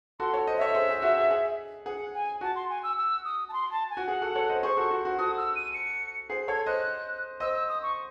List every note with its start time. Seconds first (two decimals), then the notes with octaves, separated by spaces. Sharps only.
0.19 F#4 A4 C6
0.34 A4 C#5
0.47 C5 D#5
0.57 A4 C#5 E5
0.75 G#4 C5
0.89 G#4
1.02 F#4
1.17 G#4
1.31 G#4
1.86 G#4 F#5
2.14 G#5
2.41 F#4 A5
2.55 C6
2.69 G#5
2.83 E6
2.97 E6
3.25 D#6
3.48 A5
3.53 C6
3.71 A5
3.90 G#5
3.97 F#4
4.08 G#4 F#5
4.22 F#4 A4
4.35 A4 C#5
4.49 C5 D#5
4.63 G#4 C5 C#6
4.77 F#4 A4
4.91 F#4
5.05 F#4
5.18 F#4 A4 D#6
5.37 E6
5.55 D#7
5.74 C#7
6.29 G#4 C5 C7
6.48 A4 C#5 G#6
6.66 C5 D#5 F#6
7.40 C5 D#5 E6
7.54 E6
7.69 D#6
7.82 C#6